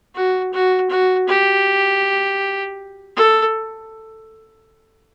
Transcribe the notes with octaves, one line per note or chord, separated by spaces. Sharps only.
F#4
F#4
F#4
G4
A4